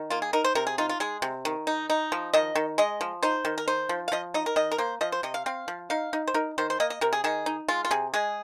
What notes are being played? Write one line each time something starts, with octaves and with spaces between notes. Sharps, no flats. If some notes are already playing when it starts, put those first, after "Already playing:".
Already playing: D#3
A#3 F4
G#4
D#4 A#4
C5
C3 A#4
G#4
D#4 F4
F4
G#3 G#4
C3
D#3
D#4
D#4
F3
D#3 D#5
D#3
G#3 D#5
F3
D#4 C5
D#3
A#4
D#4 C5
F3
F5
F3 D#5
D#4 D#5
A#4
D#3 D#5
A#4
A#3 C5
F3 D#5
C5
C3 D#5
F5
C4 F5
F3
D#4 F5
D#4
C5
D#4 A#4
D#3 C5
C5
A#3 D#5
D#5
C3 A#4
G#4
D#3 G#4
D#4
G#3 F4
F4
C3 G#4
G#3 G#4